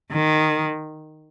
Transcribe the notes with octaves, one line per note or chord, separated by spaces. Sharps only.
D#3